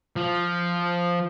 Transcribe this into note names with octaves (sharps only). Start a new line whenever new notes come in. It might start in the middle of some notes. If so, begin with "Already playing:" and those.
F3